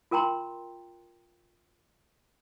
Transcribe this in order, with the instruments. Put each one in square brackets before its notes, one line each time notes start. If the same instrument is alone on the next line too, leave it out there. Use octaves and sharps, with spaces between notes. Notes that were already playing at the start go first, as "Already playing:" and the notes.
[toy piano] F4 A#4 G5 A#5 C6